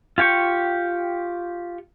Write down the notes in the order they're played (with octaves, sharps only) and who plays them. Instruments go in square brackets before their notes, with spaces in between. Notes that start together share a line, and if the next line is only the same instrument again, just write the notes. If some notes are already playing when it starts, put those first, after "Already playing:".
[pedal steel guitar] F4 G4 G5 C#6